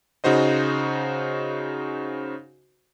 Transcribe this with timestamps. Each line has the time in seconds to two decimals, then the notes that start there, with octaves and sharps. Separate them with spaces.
0.24 C#3 D#4 F#4 C5 D#5